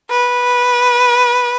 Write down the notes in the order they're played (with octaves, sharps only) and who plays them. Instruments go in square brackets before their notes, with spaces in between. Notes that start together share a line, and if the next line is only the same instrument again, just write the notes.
[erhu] B4